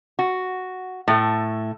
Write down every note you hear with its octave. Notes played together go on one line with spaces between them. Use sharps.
F#4
A2 A3